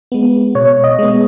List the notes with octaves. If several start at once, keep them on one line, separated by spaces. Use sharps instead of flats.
G#3 B3
B2 C#5
D#5
G#3 B3